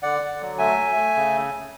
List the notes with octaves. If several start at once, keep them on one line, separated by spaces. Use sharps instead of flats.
D3 D5 F#5
D3
F#3
A3 E5 G#5
A3
A3
C#3